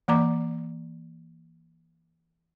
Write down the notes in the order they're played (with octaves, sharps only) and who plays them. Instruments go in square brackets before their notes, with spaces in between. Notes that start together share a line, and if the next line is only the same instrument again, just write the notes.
[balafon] E3 A#3 D5 A#5 D6